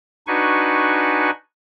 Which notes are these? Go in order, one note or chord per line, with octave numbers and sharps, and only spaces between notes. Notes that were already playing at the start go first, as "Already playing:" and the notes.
D4 D#4 F#4 B4 G#5 C#6